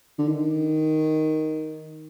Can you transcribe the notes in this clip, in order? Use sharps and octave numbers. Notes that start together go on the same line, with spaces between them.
D3
D#3